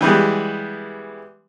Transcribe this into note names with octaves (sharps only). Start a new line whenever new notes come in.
E3 G3 G#3 B3